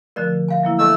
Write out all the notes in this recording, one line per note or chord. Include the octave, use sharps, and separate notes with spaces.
D3 F3 A3 A#4 D5
E5 F5 G#5
F#3 A#3 E4
A3 D4 D#5 E5 E6